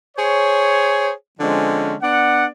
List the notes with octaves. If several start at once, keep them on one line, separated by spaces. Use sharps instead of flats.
G#4 C5 C#5
D3 F3 G#3 C4 C#4
B3 D4 D5 F#5